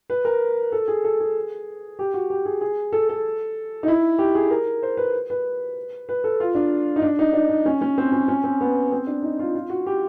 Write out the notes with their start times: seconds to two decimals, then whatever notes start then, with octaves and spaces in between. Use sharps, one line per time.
0.10 B4
0.25 A#4
0.72 A4
0.88 G#4
1.04 A4
1.20 G#4
1.99 G4
2.14 F#4
2.30 G4
2.45 G#4
2.61 G#4
2.93 A4
3.09 A4
3.83 D#4
3.88 E4
4.19 G4
4.35 G#4
4.51 A#4
4.83 C5
4.97 B4
5.30 B4
6.09 B4
6.24 A4
6.40 F4
6.55 D4
6.96 D#4
7.02 D4
7.19 D#4
7.33 D4
7.49 D4
7.66 C#4
7.81 C#4
7.98 C4
8.12 C#4
8.28 C#4
8.44 C4
8.61 B3
8.92 C4
9.07 D4
9.22 D#4
9.39 F4
9.55 F4
9.70 F#4
9.86 G4